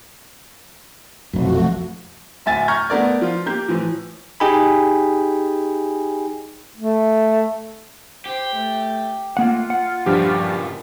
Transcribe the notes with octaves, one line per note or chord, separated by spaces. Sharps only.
F1 B1 F#2 F3 A3 F#4
D1 E5 G#5 A6
A#5 C#6 F6 G6 G#6
A3 B3 A#4 D5
F3 F4
A#3 G4 G6
A2 E3 F3
D#4 G4 G#4 G5 G#5 B5
A3
G4 C5
A3
A3 A#3 F4 F#5
F#5
G2 A#2 C#3 F3 G4